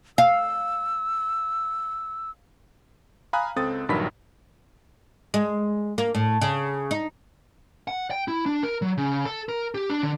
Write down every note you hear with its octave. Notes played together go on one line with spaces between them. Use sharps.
F5 E6
F5 G#5 A#5 B5 D#6 F#6
C#2 C4 A4 D#6 A6
A#1 G2 D#3 F#3 B5 B6
G#3
A#3
A2
C#3
D#4
F#5
G5
E4
D4
A#4
F#3
C#3
A4
A#4
G4
D4
D3